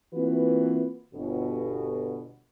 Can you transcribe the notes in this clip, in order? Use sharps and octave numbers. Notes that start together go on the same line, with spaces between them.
E3 A#3 C4 F4 F#4 B4
G1 B2